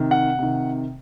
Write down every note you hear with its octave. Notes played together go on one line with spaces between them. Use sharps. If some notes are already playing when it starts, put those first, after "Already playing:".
Already playing: C3 D#3
F#5
C3 D#3